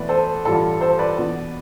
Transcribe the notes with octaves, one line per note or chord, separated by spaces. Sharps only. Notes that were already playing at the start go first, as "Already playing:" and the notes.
Already playing: E2 B2 A3 B4 D5
A4 C5
A1 G2 D3 G3 F4 A4
A4 C5
B4 D5
E2 B2 B3